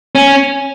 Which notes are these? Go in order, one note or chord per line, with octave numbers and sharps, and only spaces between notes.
C#4